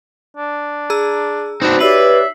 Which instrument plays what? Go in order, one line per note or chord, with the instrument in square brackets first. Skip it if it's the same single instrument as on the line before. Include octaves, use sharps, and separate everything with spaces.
[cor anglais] D4
[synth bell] G#4 A#5 E6
[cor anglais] B3 [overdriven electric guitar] C4 D4 [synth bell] D#4 F#4
[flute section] G4 C#5 D5 [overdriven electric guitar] B4 [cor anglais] E5 [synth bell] B6 C7 F#7